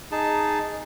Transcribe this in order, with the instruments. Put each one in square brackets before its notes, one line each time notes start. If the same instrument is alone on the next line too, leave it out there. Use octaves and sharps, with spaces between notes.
[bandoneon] D#4 G#4 A5